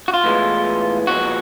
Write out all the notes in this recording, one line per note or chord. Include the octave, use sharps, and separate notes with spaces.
F#4
F4
A2 E3 G#3 B3
A#2 F3 G#3 B3 F#4